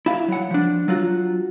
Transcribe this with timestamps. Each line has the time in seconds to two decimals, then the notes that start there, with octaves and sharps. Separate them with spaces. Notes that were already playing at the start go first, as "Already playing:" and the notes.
0.06 E4 F5
0.28 F#3 F#5
0.51 F3 D4
0.88 F#3 F4 F#4